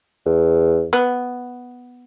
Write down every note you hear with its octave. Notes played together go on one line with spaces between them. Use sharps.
E2
B3